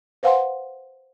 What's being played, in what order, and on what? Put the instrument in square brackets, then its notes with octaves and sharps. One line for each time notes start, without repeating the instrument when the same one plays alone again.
[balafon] B4 C5 F5 F#5 G#5 C6